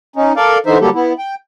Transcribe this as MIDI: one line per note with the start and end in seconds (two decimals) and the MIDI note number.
0.16 0.33 61
0.16 0.33 63
0.36 0.58 69
0.36 0.58 70
0.36 0.58 74
0.36 0.58 77
0.66 0.78 50
0.66 0.78 52
0.66 0.78 63
0.66 0.78 72
0.66 0.78 76
0.81 0.90 50
0.81 0.90 54
0.81 0.90 55
0.81 0.90 58
0.81 0.90 67
0.81 0.90 69
0.94 1.13 59
0.94 1.13 64
1.18 1.35 79